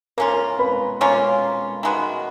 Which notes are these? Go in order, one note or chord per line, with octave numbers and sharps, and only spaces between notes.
A#3 C#4 F4 A#4 A#5
B4 B5
A#3 C#4 F4 C#5 C#6
D#3 G#3 B3 F#4